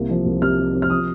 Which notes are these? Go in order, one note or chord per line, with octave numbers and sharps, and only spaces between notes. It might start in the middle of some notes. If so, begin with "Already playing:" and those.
Already playing: C2 A#3
F3
C2
C3 F6
C3
C3
F6
F3 D#6